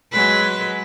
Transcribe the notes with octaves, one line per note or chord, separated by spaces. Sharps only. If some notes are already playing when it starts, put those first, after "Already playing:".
F#3 G#3 B4